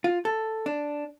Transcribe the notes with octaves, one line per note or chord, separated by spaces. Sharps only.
F4
A4
D4